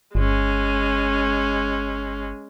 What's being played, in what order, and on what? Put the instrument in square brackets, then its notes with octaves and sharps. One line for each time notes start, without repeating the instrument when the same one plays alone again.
[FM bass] G1 [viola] G#3 C#4